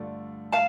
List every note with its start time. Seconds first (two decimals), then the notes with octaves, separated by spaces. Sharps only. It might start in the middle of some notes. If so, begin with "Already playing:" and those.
Already playing: G2 D3 A3 F4 D5
0.52 F5 A5